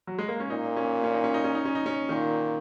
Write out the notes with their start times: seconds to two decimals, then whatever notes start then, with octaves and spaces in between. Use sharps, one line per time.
0.07 F#3
0.18 G#3
0.28 A#3
0.40 C#4
0.50 A#2 D#4
0.77 C#4
1.04 C#4
1.14 D#4
1.24 C#4
1.34 D#4
1.44 C#4
1.55 D#4
1.65 C#4
1.75 D#4
1.86 C#4
2.09 A#2 D#3